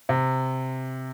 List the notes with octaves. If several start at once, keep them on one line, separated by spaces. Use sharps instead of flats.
C3